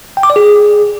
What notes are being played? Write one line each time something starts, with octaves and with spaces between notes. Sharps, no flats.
G5
D6
D5
G#4